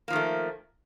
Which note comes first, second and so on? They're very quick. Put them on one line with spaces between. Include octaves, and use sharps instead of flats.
A#3 F3 D#3 A3